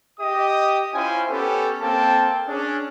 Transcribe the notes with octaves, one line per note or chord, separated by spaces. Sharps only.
G4 D#5 D#6
C#4 E4 F4 C5 G5 G#5
B3 C#4 G4 A4
A#3 C4 A4 G5 A5
C#4 D4 G#4